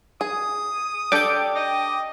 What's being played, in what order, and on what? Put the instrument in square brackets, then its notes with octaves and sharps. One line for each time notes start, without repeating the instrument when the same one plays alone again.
[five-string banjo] G#4 [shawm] D#6
[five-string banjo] D4 G4 A4 [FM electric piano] G5 D6
[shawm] D#5